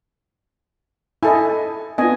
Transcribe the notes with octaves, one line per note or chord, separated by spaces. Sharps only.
E4 A4 D#5 G#5
B3 D4 F4 D#5 G#5